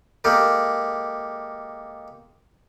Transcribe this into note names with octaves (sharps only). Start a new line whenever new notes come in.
G#3 A#3 G4 A4 A#4